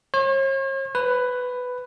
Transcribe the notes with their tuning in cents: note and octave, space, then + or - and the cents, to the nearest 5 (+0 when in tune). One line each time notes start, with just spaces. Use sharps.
C#5 -45
B4 +10